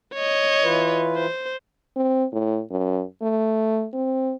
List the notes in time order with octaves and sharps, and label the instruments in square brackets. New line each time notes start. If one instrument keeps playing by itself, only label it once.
[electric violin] C#5 D#5
[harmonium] E3 F4 B4
[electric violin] C5
[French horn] C4
A2
F#2
A3
C4